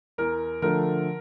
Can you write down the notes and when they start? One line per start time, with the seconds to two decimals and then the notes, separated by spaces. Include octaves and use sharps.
0.18 E2 A#4
0.62 D3 F3 A3 A#4